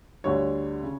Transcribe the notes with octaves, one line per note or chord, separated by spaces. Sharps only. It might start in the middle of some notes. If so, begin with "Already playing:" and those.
D2 D3 G3 C#5
C#3